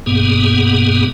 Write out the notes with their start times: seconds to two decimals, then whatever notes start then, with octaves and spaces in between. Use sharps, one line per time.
0.06 G2 B2 A#3 B3 G#4